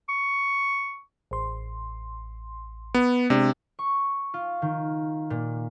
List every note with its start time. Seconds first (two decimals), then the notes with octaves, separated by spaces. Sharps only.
0.09 C#6
1.31 A1 C6
2.94 B3
3.30 C3 G#3 D4 E6
3.79 C#6
4.34 F4
4.62 D#3
5.30 A#2